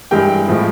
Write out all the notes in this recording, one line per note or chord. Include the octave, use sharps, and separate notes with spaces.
G2 E3 G#3 G4 G5
A2 F3 G#3